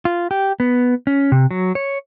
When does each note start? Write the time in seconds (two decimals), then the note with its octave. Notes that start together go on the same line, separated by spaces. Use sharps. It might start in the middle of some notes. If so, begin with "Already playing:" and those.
0.05 F4
0.31 G4
0.60 B3
1.07 C#4
1.32 C3
1.51 F#3
1.75 C#5